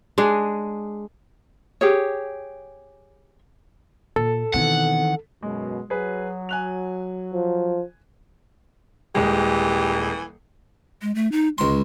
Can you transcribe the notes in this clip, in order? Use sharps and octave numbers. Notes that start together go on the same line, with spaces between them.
G#3 D4 G#4
G4 G#4 C#5
A#2 A4
B2 D#3 E3 B3 C4 F#5
F#2 B2 G#3
F#3 G#4 B4
G#5 F#6 F7
F3
D#1 E3 G#3 G4
G#3
A3
D#4
C#2 G#3 C6